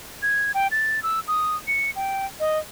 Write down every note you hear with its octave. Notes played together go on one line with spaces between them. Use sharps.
G#6
G5
A6
E6
D#6
C#7
G5
D#5